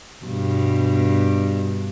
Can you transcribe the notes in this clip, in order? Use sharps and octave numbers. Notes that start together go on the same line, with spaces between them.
G2 B2